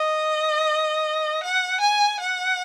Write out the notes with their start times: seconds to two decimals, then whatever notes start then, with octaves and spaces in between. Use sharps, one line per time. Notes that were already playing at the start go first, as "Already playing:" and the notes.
Already playing: D#5
1.43 F#5
1.80 G#5
2.20 F#5